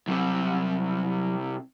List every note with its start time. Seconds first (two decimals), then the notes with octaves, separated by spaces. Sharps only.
0.07 C2 C3 F#3